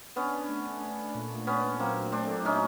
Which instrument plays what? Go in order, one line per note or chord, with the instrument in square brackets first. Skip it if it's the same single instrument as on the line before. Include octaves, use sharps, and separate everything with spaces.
[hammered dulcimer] B3 C#4 [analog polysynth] D4
[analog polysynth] A3
D4
A#2
[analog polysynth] A#2 [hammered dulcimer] B3 C#4
[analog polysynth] F#3 [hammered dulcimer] A#3 C4
[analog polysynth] A3 [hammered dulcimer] C4 D4
[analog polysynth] A3 [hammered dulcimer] C#4 D#4